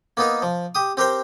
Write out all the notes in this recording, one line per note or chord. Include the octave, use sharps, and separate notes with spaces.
A#3 B3 D#4 A#4
F3
G4 D#6
C4 G4 A#4 C5 G5